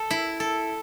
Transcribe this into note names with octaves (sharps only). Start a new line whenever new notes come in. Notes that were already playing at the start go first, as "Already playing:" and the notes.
Already playing: A4
E4
A4